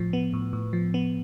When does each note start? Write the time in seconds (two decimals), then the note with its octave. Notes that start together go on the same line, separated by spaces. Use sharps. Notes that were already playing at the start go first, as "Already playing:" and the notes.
Already playing: A2 F3
0.13 B3
0.33 A2
0.53 A2
0.73 F3
0.94 B3